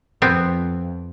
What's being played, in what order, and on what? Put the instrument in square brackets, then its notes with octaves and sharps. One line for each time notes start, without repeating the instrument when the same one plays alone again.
[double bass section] F2 [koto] B3 C4